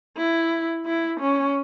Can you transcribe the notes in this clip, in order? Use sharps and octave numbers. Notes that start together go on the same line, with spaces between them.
E4
E4
C#4